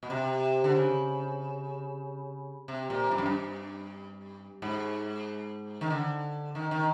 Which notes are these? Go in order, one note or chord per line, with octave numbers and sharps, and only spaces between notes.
B2
C3
D3
C#3
C3
A#2
G2
F#2
G2
G#2
D#3
D3
D#3
D#3